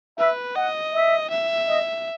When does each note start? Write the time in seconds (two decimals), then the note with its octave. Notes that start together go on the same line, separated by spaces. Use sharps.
0.18 B4 E5
0.55 D#5 F#5
0.93 E5
1.30 E5
1.68 D#5